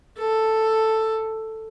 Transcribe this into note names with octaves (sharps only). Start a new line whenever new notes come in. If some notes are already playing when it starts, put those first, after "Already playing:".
A4